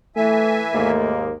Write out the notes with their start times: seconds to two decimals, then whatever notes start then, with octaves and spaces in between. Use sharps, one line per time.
0.16 E3 A3 E5 G#5
0.74 D#2 G#2 A3 A#3